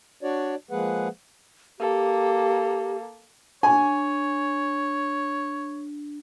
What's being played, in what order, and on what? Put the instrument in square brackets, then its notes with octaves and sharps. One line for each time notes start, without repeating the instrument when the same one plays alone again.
[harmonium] D4 F#4 C#5 D5
F3 G#3 A#3 G#4 B4 F#5
[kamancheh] A#3 A4 [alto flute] G4
[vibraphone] D4 [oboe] C#5 [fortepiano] G#5